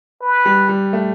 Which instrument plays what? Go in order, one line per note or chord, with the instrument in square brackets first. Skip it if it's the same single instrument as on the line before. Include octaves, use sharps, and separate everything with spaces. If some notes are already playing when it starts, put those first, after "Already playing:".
[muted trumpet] B4
[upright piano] G3
G3
A3